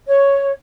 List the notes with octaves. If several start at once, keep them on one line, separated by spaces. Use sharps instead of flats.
C#5